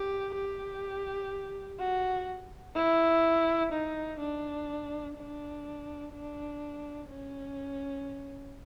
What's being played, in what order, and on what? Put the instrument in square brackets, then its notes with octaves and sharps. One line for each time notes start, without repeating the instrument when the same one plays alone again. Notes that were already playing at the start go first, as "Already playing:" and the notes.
Already playing: [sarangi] G4
G4
F#4
E4
D#4
D4
D4
D4
C#4